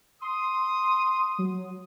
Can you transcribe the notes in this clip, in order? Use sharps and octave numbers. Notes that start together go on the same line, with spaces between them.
C6 D#6
F#3